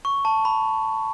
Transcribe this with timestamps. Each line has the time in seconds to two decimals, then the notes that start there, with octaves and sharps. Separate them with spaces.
0.05 C#6
0.25 A5
0.45 B5